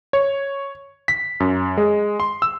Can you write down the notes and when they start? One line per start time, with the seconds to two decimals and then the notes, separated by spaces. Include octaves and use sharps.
0.13 C#5
1.08 B6
1.40 F#2
1.77 G#3
2.20 C6
2.42 E6